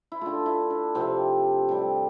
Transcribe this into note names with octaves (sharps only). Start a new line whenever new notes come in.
E4
D3 A3 F4
E4
D4
C3 F3 A3 C4
A2 G3